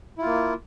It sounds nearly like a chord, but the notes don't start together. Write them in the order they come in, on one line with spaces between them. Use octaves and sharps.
E4 F4 A#3